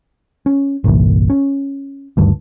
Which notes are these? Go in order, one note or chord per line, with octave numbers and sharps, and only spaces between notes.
C#4
G1 C2 A#2 E3
C#4
D2 G2 D#3